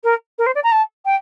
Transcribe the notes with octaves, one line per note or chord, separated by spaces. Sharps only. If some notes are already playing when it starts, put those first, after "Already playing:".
A#4
A#4
C5
D5
A#5
A5
G5